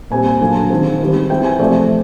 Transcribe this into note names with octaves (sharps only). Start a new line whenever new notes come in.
A#2 G3 C4 G#5
G#5
D3 F#3 A#3 G#5
A5
D#3 G#3 C4
D#3 G3 C4
E3 G#3 C4 G5
G#5
C3 F3 A3 C4 D5